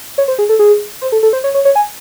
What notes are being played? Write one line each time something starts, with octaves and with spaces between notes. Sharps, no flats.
C#5
C5
G#4
A4
G#4
C5
A4
A4
C5
C#5
C#5
C#5
G#5